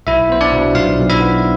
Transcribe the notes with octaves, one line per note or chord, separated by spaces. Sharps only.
B1 E4 E5
B3 C5
D4 D5
B2
B1 F4 F5
B1
E4 E5
B3